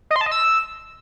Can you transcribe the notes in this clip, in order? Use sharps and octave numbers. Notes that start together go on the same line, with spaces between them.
D#5
C6
A5
D#5
E6